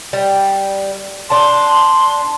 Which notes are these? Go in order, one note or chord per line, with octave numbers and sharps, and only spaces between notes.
G3
D4 A5 C6